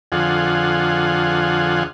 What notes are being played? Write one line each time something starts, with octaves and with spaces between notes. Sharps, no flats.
F2 D3 F4 G#4 F#5